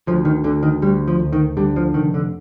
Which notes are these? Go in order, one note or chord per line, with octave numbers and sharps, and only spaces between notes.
D2 F3
D#3
D2 D3
D#3
D2 G3
F3
D2
D#3
D3 G3
F3
F1 D#3
D3